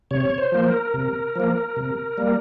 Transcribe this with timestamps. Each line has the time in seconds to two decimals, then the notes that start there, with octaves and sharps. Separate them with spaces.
0.11 C3 C#5
0.38 C5
0.52 F3 A#3
0.66 A#4
0.94 C3
1.36 F3 A#3
1.76 C3
2.18 G3 A#3